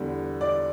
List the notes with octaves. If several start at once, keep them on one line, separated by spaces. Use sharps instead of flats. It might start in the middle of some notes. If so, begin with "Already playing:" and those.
Already playing: E2 D3 G3
D5